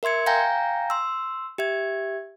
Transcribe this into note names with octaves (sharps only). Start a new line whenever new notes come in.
A#4 E5 C6 G#6 C#7
F5 G5 G#5 A#5 G6 A#6
C6 E6
G4 E5 G#6